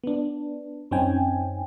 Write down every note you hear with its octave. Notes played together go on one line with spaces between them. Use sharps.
B3 D4
F#2 C4 C#4 D#4 G5 G#5